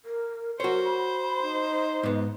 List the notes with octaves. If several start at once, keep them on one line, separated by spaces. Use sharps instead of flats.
A#4
F#4 A#4 C5 C#5
B5
D#4
G#2 B3